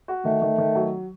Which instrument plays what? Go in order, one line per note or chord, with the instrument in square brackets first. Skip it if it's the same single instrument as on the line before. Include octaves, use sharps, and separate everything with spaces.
[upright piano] F#4
[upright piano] D#3 [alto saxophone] A3
[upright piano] D#3
D#3
F#3